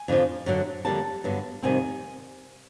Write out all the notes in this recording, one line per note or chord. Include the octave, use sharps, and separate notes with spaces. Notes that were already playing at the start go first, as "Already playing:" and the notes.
Already playing: G#5
F2 D3 F3
F#2 D3 F#3
F2 D3 G3 A#3 A5
G2 D3 F#3 B3
F2 C3 D#3 G3 C4 G#5